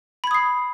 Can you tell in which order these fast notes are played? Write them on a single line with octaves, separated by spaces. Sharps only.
B5 G#6 D#6 C7